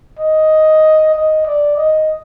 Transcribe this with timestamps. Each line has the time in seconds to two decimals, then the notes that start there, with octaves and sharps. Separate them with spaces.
0.19 D#5
1.14 D#5
1.46 D5
1.77 D#5